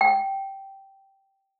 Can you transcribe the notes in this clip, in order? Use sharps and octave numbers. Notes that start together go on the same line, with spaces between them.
G5